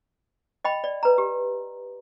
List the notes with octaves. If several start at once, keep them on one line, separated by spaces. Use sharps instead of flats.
D#5 G5 B5
D5
B4 A#5
G4